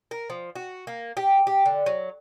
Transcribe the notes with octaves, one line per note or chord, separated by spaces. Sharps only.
A#4
F3
F#4
A#3
G4
G4
D3
F#3